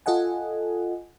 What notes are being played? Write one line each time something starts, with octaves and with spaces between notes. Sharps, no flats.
F4 A4 D#5 F#5 G#5